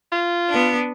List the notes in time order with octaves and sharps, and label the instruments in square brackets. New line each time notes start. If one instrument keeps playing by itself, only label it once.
[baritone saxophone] F4
[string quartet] B3 D4